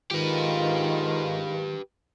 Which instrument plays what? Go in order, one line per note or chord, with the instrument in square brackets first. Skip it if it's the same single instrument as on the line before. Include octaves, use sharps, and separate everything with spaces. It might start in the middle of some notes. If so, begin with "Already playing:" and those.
[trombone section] G#2 F4 [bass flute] D#3 [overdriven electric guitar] G4 B4